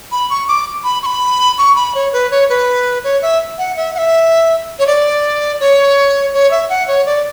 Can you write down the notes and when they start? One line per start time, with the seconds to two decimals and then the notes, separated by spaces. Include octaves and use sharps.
0.12 B5
0.30 C#6
0.48 D6
0.84 B5
1.03 C#6
1.06 B5
1.58 C#6
1.76 B5
1.95 C#5
2.13 B4
2.31 C#5
2.49 B4
3.04 C#5
3.22 E5
3.58 F#5
3.77 E5
3.95 F#5
3.98 E5
4.79 C#5
4.87 D5
5.60 C#5
6.34 C#5
6.51 E5
6.69 F#5
6.88 C#5
7.06 D5